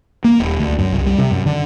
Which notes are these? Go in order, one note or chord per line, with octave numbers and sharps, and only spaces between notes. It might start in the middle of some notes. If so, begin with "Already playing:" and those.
A#3
D#1
D2
F#2
C2
G3
C3
F#2
D3